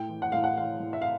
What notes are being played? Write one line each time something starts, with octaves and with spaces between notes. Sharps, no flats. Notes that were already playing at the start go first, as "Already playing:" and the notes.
Already playing: A2 G5
E3
F#5
A2 F5
F#5
E3 F5
A2
E5
F5